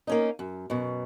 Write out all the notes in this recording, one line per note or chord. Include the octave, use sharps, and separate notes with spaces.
A#3 C#4 D#4
F#2
F#2 B2